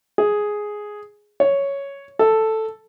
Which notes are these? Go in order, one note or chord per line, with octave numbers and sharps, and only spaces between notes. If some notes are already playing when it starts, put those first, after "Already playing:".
G#4
C#5
A4